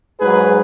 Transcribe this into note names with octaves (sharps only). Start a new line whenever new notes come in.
G#2 F#3 G#4 B4